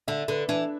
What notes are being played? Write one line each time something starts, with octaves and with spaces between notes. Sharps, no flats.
D3 E5
D3 B4
E3 D4